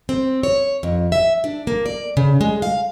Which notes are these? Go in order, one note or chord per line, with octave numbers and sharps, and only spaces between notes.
C4
C#5
F2
E5
D4
A#3
D5
C#3
G#3
F5